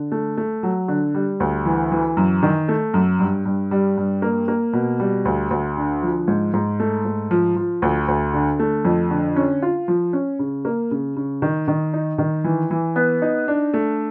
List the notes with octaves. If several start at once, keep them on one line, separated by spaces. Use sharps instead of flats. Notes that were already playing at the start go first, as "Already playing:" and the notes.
Already playing: D3
A3
A3
F#3
D3
G3
D2
E3
E3
F#2
D#3
A3
F#2
G2
G2
G3
G2
A#3
A#3
B2
G3
D2
D2
D3
F3
G#2
G#2
A3
G#2
F3
F3
D2
D2
D3
A3
F2
D3
C#4
F4
F3
C#4
C#3
A#3
C#3
C#3
D#3
D#3
D#4
D#3
E3
E3
B3
D#4
D4
A3